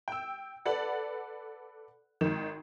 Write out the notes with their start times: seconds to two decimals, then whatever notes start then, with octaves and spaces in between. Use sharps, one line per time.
0.08 G5 E6
0.65 A4 B4 D5 F#5
2.21 G#1 D#3